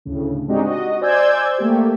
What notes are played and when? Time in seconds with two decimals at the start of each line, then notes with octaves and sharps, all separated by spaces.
0.05 D2 A2 C#3
0.48 G#3 C4 D4 D#4 F#4 G4
0.63 F#4 D#5
1.01 C5 D5 G#5 E6 G6 G#6
1.58 A3 A#3 G4